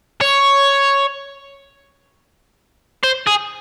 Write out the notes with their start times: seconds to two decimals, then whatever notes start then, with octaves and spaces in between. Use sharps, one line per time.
0.21 C#5
3.04 C5
3.27 G#4